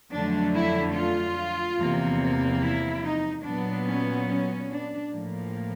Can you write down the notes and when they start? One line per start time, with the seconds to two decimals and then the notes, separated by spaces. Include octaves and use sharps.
0.12 F2 D3 F#3 A3 D4
0.55 E4
0.95 F4
1.78 E2 C3 F3 A#3
2.62 E4
3.04 D#4
3.44 A#2 F#3 B3 D4
3.86 C#4
4.28 C#4
4.70 D4
5.11 A2 F3 A#3